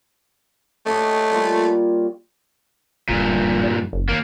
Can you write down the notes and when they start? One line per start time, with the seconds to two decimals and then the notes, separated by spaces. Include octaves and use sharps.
0.86 A3 G4 C#5 D#5
1.31 G3 A#3 F4
3.09 D1 G2 A#2
3.63 G3
3.93 F#1
4.09 D#2 A#3